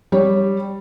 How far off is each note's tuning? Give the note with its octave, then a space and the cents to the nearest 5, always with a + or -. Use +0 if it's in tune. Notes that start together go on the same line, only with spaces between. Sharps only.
G3 +0 C#5 +0